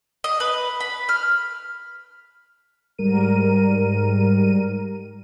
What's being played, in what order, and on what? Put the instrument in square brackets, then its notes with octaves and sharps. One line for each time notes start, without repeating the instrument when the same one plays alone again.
[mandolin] D#5
B4
B5
F6
[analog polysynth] G#2 G3 A#4 D#7